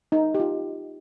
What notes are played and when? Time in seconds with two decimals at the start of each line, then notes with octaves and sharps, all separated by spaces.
0.12 D#4
0.34 G4
0.40 F4